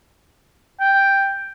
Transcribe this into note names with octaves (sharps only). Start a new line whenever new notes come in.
G5